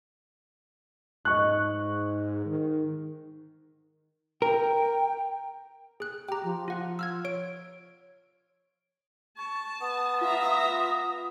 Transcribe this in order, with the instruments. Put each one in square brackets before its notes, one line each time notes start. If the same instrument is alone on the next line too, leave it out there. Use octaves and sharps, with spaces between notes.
[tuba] G#2 [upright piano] D#5 C#6 F#6
[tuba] D#3
[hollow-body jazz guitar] A#4 [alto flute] G5
[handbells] G#4 F#6
[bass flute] G4 [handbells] G5 A#5
[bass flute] F3
[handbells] F4 F#5 F#6
E6 F6 G#6
C#5 D7
[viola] A5 [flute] C#6
[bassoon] B3 [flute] D#6
[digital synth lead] F4 [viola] E5 A#5